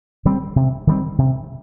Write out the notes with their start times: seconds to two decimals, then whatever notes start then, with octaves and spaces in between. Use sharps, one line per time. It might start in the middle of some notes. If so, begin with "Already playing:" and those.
0.25 D#3 G3 C4
0.56 C3
0.87 D#3 G3 C4
1.18 C3